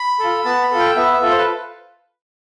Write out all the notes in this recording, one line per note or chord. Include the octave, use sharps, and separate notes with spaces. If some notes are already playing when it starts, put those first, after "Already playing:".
Already playing: B5
F4 A4
B3 A5
B5
F4 A4
G5
B3 E5
E5
F4 A4
C5
B4